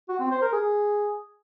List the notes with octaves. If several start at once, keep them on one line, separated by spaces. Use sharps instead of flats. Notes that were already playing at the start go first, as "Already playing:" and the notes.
F#4
C4
C5
A#4
G#4